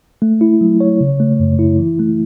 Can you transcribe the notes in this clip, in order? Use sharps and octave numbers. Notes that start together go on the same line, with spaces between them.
A3
E4
F#3
C#5
C#3
A3
F#2
E4
E3
A3